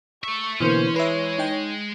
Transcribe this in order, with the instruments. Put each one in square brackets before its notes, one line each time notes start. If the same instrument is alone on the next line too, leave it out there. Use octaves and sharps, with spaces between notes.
[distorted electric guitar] A4 E5 [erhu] C#6
[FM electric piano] B2 D3 A#3 [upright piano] E3 [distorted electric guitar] C#4 [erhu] C5
[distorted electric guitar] G#3 [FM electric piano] B4 E5 [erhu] C#5
[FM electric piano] D#4 G5